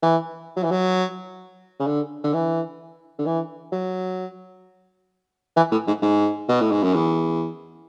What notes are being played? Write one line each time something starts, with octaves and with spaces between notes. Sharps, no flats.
E3
F#3
E3
F#3
C#3
D3
D3
E3
D3
E3
F#3
E3
A2
G#2
G#2
B2
A2
G#2
F#2
E2